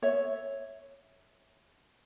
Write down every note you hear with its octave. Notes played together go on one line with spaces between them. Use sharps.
C#5 E5